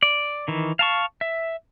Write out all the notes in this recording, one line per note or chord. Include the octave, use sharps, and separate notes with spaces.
D5
D#3 E3
F5 A5 C#6
E5